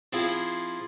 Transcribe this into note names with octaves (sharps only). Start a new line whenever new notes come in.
F3 C4 E4 G#4